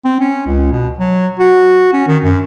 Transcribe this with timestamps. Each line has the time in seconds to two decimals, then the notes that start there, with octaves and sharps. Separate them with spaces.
0.05 C4
0.20 C#4
0.46 C#2
0.72 B2
0.99 F#3
1.39 F#4
1.93 C#4
2.08 D#3
2.24 F#2